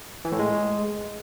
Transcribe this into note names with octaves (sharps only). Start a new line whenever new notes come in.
E3
A2
G#3